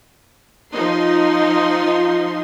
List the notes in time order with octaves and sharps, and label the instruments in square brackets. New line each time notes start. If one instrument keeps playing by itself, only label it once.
[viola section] F3 D#4 C6